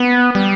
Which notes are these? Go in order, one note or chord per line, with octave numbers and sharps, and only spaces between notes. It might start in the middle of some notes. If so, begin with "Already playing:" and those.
Already playing: B3
G3